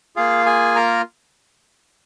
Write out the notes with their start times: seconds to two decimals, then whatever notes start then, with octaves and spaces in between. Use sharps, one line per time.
0.16 A#3 F4 G#4 F5
0.46 G#4 G#5
0.76 A#4 A#5